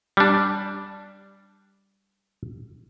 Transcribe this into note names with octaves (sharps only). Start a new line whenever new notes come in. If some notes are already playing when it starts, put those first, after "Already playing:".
G3 D4